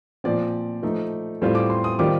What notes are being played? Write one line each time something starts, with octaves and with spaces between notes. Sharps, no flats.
A#2 F3 C4 D5
F3 A3 D#4
A2 G3 C4 F4
D6
C6
D#6
D#3 G3 C4 F4 D6